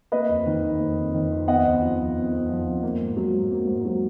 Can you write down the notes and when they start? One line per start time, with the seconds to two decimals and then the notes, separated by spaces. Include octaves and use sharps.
0.12 A#3 B4 D#5
0.29 F2
0.47 D#3
0.63 F2
0.80 A#3
0.98 F2
1.14 D#3
1.31 F2
1.48 B3 D#5 F#5
1.65 F2
1.81 F3
1.99 F2
2.16 B3
2.33 F2
2.49 F3
2.66 F2
2.83 A#3
3.01 G#2
3.17 F#3
3.35 G#2
3.51 A#3
3.67 G#2
3.85 F#3